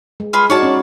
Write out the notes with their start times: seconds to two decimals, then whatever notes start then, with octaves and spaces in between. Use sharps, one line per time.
0.20 G#3
0.33 F4 G#4 B4
0.50 D#4 F#4 C#5 D5 A5
0.63 C#4